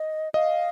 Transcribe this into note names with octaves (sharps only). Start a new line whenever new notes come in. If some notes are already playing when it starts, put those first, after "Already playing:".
Already playing: D#5
D#5 F5